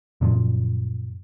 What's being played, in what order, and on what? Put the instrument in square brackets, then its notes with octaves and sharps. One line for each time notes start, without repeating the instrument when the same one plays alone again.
[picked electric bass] F#2 A#2 C#3 F3